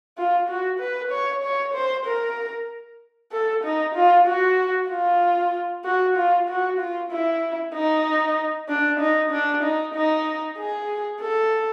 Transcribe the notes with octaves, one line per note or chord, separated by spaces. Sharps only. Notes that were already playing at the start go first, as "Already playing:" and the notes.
F4
F#4
B4
C#5
C#5
C5
A#4
A4
D#4
F4
F#4
F4
F#4
F4
F#4
F4
E4
D#4
D4
D#4
D4
D#4
D#4
G#4
A4